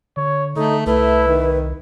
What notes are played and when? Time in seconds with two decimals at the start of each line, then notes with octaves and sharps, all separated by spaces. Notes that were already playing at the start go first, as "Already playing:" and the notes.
0.17 D3 C#5
0.56 D3 A3 D#4 A4
0.86 C2 A3 E4 B4
1.28 D#3